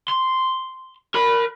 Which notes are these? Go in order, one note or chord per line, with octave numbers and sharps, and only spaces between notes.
C6
A#4 B5